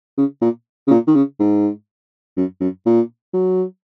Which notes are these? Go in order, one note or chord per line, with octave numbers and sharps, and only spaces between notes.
C#3
A#2
C#3
A#2
D#3
C#3
G#2
F#2
F#2
A#2
F#3